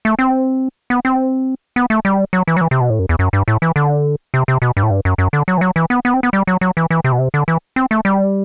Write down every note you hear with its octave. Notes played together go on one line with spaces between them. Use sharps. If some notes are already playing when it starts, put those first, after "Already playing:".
A3
C4
B3
C4
B3
A3
G3
F#3
E3
F#3
E3
C3
B2
A2
F#2
E2
F#2
G2
A2
E3
D3
C3
C3
B2
G2
A2
G2
F#2
F#2
D3
F#3
E3
F#3
E3
B3
B3
C4
B3
G3
F#3
F#3
E3
E3
C3
B2
C3
D3
E3
C4
A3
G3